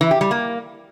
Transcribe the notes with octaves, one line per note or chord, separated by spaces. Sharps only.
E3
G4
G3
A#3